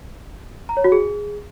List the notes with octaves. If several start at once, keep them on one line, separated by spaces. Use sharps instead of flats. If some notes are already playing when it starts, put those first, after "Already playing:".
A#5
C#5
F#4
G#4